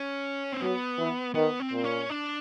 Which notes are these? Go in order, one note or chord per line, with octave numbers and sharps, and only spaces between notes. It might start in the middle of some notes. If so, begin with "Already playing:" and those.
Already playing: C#4
C4
F#3 B3
E3
D#3 B3
C4
A#2
C#4
D4